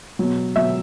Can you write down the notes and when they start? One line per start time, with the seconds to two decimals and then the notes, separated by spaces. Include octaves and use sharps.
0.19 B2 F#3
0.56 B2 F#3 E5